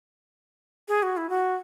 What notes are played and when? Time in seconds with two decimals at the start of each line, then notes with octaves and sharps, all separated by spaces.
0.88 G#4
1.02 F#4
1.17 E4
1.30 F#4